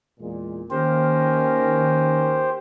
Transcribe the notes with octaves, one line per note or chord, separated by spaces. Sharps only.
E2 A#2 G#3
D#3 A#3 C#4 G4 A#4 C5